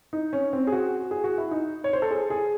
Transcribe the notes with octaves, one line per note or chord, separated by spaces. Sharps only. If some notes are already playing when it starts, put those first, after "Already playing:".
D#4
C#4
C4
G#4
F#4
G#4
F#4
E4
D#4
C#5
C5
A4
G#4
G#4